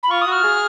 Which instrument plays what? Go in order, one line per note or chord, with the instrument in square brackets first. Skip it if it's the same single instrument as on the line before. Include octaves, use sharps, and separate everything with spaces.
[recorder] B5
[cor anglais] F4 [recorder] C#6
[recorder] D#6
[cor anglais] F#4
[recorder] F6
[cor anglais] G#4